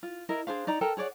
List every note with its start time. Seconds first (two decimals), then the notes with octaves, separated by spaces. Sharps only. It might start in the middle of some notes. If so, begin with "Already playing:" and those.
0.03 F4
0.29 E4 A#4 D#5
0.47 D4 G#4 C5 F5
0.67 D#4 D5 A#5
0.81 A4 A#4 G5 A#5
0.97 G#4 C#5 D5 F#5